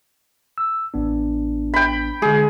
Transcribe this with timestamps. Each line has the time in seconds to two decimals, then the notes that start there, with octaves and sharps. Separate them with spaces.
0.58 E6
0.94 A1 B3 D4
1.74 G5 B5
2.22 D3 G#3 G#4